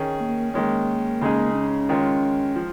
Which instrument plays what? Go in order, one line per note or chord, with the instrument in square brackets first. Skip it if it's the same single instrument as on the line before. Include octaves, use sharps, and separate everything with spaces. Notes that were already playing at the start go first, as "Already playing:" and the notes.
Already playing: [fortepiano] D#3 C#4 G#4
[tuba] A#3
[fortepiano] D#3 G#3 C#4 [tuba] A#3
[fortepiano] C#3 G#3 D#4 G#4
[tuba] C#4
[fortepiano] D#3 G#3 F4 C#5
F3